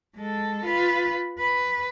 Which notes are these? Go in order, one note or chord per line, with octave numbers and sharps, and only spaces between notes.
G#3 A4
F4 B4
B4